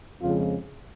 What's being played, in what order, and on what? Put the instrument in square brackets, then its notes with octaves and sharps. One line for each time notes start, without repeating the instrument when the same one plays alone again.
[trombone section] F2 C#3 F3 G#3 F4